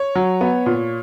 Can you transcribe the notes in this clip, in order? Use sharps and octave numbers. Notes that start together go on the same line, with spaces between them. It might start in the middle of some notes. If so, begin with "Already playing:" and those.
Already playing: C#5
F#3
B3
A#2